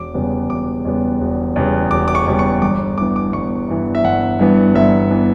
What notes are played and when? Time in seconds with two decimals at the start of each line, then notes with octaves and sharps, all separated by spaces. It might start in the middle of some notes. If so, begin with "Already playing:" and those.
Already playing: E1 D6
0.14 E2 C#3 G3 B3
0.50 E1 D6
0.85 E2 C#3 G3 B3
1.21 E1
1.56 E2 C#3 G3 B3
1.91 E1 D6
2.08 D6
2.15 C#6
2.27 E2 C#3 G3 B3
2.39 C#6
2.62 G1 D6
2.98 G2 E3 B3 D6
3.16 D6
3.33 G1 C#6
3.69 G2 E3 B3
3.95 E5
4.04 G1 F#5
4.39 G2 E3 B3
4.75 G1 E5
5.11 E3 B3